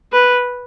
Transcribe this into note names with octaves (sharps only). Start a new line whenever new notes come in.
B4